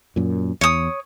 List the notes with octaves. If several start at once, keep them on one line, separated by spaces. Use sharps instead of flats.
F#2 A#2
E2 C#5 D#6